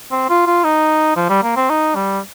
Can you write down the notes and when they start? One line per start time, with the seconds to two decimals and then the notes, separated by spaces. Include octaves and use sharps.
0.12 C4
0.29 F4
0.47 F4
0.64 D#4
1.16 F3
1.29 G3
1.43 A#3
1.56 C4
1.70 D#4
1.96 G3